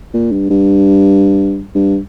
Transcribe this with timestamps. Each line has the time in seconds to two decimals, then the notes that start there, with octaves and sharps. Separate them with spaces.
0.14 A#2
0.32 G2
0.50 G2
1.75 G2